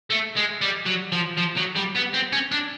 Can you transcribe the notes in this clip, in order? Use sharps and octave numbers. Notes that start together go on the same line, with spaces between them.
A3
G#3
G3
F#3
F3
F3
F#3
G3
B3
C4
C#4
D4